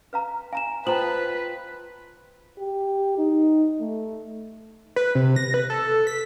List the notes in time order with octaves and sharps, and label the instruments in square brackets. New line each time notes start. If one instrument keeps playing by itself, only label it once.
[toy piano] B4 F5 A#5
[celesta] F5 A#5 E7 [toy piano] G#5
[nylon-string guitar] F4 G5 [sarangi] B4 [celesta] C5 F#7 [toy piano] A5 A#5 D#6
[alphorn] G4
D#4
A3
[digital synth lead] B4
C3
A#6
B4
A4
B6